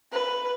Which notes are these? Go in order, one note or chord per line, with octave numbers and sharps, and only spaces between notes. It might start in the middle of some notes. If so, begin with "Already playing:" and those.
B4